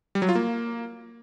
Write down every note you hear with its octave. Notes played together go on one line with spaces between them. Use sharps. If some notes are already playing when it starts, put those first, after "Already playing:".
G3
F#3
F4
A#3